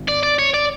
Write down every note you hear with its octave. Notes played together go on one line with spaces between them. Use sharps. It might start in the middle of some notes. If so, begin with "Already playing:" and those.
Already playing: G#1
D5
D5
C#5
D5